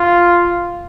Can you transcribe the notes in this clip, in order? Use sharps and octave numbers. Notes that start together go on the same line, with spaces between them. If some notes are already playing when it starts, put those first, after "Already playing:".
Already playing: F4